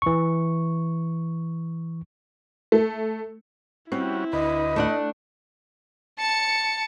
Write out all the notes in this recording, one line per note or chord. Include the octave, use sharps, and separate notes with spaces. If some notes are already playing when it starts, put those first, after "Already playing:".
E3 C#6
A3
G3 C4 C#4 E4 F#4
D2 B4 D#5
A3 D4 F#5
A5 C#7